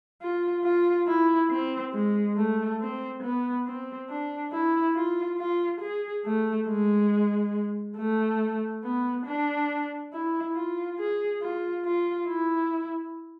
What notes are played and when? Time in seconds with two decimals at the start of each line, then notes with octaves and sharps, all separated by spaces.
0.22 F4
0.64 F4
1.07 E4
1.50 C4
1.94 G#3
2.37 A3
2.81 C4
3.23 B3
3.66 C4
4.09 D4
4.52 E4
4.95 F4
5.39 F4
5.81 G#4
6.25 A3
6.68 G#3
7.97 A3
8.84 B3
9.26 D4
10.13 E4
10.55 F4
10.98 G#4
11.42 F4
11.85 F4
12.28 E4